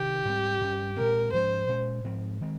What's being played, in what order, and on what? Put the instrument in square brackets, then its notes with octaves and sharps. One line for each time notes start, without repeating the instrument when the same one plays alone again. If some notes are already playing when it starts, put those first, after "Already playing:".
Already playing: [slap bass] C3 D#3 [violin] G4
[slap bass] G#2 G3 C4
G2 G3 C#4
[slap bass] A#2 G#3 C4 [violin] A#4
[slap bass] G#2 F3 G#3 C#4 [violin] C5
[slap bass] A#2 G#3 C#4
G#2 F3 C4
D#3 G#3 C4